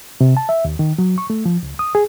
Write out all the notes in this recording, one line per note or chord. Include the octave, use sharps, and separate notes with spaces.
C3
A5
E5
D#2
D#3
F#3
C#6
A3
F3
C#2
D#6
G#4